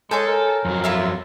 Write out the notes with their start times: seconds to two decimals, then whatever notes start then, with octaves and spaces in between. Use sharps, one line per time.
0.11 G#3 A4 C#5 G#5 G6
0.27 A#4
0.65 F2 F#3
0.84 E4 F4 E5